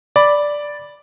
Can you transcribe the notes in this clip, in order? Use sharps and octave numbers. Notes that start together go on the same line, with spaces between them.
D5 B5